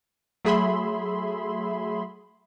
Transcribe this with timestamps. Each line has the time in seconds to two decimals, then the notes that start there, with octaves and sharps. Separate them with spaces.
0.45 F#3 A3 G#4 E5 B5 C6